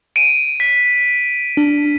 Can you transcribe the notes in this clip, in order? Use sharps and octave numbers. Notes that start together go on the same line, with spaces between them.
D7 D#7
B6
D4